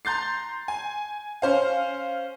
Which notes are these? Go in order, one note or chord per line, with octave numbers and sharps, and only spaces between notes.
A#5 C6 G6 A6 C7
G#5
C#4 C5 F5